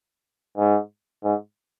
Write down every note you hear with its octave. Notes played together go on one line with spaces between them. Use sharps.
G#2
G#2